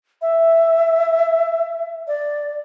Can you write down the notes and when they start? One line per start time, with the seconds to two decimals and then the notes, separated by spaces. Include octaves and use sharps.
0.22 E5
2.08 D5